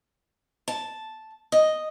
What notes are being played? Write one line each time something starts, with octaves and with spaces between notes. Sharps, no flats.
A5
D#5